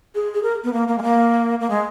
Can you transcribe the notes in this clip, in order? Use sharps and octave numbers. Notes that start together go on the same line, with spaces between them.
G#4
G#4
A#4
B3
A#3
A#3
G#3
A#3
A#3
G#3